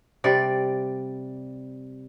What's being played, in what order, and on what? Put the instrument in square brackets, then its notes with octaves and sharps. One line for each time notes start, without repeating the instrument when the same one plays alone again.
[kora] C3 G3 D5